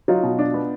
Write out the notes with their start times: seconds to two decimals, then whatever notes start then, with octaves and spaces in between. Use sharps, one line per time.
0.08 F#3 D#4 F4
0.23 B2
0.39 D4
0.54 B3